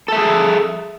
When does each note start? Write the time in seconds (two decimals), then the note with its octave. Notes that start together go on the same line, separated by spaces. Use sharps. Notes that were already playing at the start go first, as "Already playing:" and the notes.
0.08 A4
0.12 E5
0.16 G#4